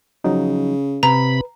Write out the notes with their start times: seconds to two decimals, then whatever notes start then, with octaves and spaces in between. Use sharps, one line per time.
0.24 C#3 F3 F#3 D#4
1.03 C3 B4 A#5 B5